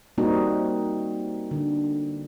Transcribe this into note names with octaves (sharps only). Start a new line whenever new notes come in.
G3 A#3 C4 D#4 F#4
D3